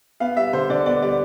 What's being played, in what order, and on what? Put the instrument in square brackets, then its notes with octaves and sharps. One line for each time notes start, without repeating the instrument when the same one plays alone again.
[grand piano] B3 F5
G3 E5
D3 C5
D3 D5
B3 D5
G3 D5